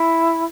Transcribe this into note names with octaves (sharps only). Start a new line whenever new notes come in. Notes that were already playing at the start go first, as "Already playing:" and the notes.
Already playing: E4